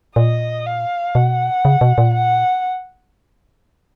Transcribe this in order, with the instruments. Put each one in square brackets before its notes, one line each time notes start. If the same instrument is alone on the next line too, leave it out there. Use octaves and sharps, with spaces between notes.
[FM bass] A#2 [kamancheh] D#5
[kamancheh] F5
[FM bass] B2 [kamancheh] F#5
[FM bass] C#3
B2
A#2
[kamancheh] F#5